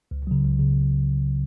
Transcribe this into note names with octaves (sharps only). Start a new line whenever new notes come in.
C#2
C#3 F#3
C#2
C#3